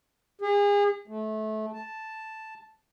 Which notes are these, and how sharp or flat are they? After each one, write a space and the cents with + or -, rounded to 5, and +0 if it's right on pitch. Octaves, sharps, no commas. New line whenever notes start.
G#4 -35
A3 -25
A5 +0